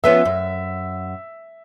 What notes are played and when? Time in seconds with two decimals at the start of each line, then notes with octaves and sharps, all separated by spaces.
0.04 F3 B3 C#4 E5
0.25 F#2